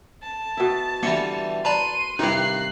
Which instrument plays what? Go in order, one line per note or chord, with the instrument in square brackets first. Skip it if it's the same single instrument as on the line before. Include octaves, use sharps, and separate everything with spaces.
[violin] A5
[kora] B2 E4
[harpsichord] D3 E3 G3 [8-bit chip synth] A#3 C#7
[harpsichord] B4 [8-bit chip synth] D5 A5 A#5 [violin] C6 D#7
[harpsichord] G2 D#3 [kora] C3 [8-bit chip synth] D#4 E4 [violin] F#6 C7